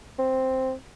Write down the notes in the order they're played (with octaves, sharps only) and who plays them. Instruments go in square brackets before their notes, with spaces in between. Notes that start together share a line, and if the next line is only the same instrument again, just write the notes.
[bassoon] C4